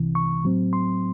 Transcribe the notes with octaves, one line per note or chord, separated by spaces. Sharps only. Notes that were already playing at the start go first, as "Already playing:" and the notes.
Already playing: C2 C3 E3
C#6
A2 F#3 C4
C6